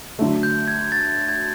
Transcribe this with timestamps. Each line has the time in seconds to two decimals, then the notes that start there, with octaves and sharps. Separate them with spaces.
0.19 D3 F#3 A3
0.43 G6
0.68 G#6
0.92 A6
1.29 G#6